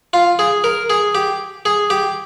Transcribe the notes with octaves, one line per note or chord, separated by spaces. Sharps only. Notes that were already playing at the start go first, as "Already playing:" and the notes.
F4
G#4
A#4
G#4
G4
G#4
G4